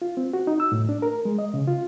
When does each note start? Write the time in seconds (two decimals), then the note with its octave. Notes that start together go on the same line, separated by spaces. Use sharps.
0.02 F4
0.17 C4
0.33 F#4
0.47 D#4
0.60 E6
0.72 A2
0.89 D4
1.02 A#4
1.25 G#3
1.39 D#5
1.54 C#3
1.68 F4